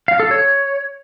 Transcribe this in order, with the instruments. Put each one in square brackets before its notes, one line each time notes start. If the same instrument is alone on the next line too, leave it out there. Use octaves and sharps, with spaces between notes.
[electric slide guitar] F5
A4
C#5